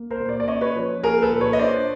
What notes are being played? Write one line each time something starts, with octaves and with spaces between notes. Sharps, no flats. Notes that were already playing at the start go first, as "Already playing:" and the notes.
Already playing: A#3
A#4 C5
A#2
C5 D5
D5
C#4 C#5 D#5
B4 C#5
F3
A#3 G#4 A#4
A4 B4
A#2
B4 C#5
D#5
D4 C5 D5